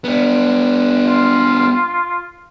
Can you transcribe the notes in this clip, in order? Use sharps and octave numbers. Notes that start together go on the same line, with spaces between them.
B3 D4
F4